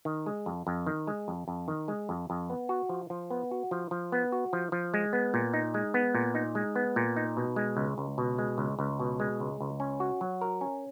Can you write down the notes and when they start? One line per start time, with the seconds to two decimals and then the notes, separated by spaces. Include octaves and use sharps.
0.05 D#3
0.26 G#3
0.46 F2
0.67 F2
0.86 D#3
1.07 G#3
1.28 F2
1.48 F2
1.68 D#3
1.88 G#3
2.09 F2
2.30 F2
2.50 B3
2.69 F#4
2.89 F3
3.10 F3
3.30 B3
3.51 F#4
3.71 F3
3.91 F3
4.12 B3
4.32 F#4
4.53 F3
4.72 F3
4.94 G#3
5.13 B3
5.34 A#2
5.54 D#4
5.74 G#3
5.94 B3
6.15 A#2
6.35 D#4
6.55 G#3
6.76 B3
6.96 A#2
7.17 D#4
7.37 B2
7.56 G#3
7.77 C#2
7.98 C#2
8.18 B2
8.38 G#3
8.58 C#2
8.79 C#2
9.00 B2
9.20 G#3
9.40 C#2
9.60 C#2
9.80 C#4
10.00 F#4
10.21 F#3
10.41 A#4
10.61 C#4